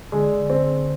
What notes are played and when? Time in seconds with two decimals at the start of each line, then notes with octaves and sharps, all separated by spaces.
0.12 D3 G#3
0.50 C4